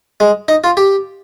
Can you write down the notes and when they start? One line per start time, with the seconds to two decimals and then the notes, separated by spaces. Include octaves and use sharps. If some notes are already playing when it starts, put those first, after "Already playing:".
0.20 G#3
0.48 D#4
0.64 F4
0.77 G4